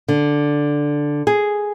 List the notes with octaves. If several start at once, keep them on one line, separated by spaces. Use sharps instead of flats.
D3
G#4